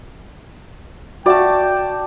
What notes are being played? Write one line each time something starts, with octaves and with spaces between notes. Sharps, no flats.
F#4 D5 E5 F5 G5 A5